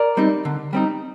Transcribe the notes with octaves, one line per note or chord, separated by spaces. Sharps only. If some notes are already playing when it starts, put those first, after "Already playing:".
Already playing: A#4 D5
G3 C4 D#4
D3
G3 C4 D#4